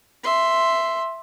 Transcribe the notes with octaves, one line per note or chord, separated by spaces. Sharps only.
E5 C6